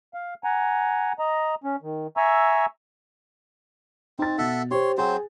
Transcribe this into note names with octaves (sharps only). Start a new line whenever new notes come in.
F5
F#5 G#5 A#5
D#5 A#5
C#4
D#3
E5 G#5 A#5 C#6 E6
C4 D#4 A6
B2 A4 E5 F#5
G4 C5 C#5 C6
F#3 C4 G#4 C5